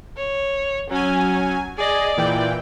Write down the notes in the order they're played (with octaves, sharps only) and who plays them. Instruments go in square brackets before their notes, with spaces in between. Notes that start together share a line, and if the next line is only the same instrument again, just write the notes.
[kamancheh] C#5
[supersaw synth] F#3 G#5 [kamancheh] C#4
[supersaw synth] G#4 D#5 [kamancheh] D5
[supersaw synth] A#2 E3 G5